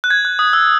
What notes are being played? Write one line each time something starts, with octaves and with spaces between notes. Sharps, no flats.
F#6
G#6
F#6
D#6
E6